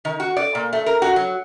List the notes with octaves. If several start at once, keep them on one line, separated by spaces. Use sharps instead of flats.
D#3
F#4
D5
A#2
A3
A#4
F#4
F#3